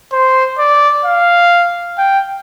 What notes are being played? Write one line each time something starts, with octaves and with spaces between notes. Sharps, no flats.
C5
D5
F5
G5